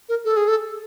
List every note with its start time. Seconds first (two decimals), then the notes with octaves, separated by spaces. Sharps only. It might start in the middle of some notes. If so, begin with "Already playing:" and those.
0.09 A#4
0.25 A4
0.37 G#4
0.48 A4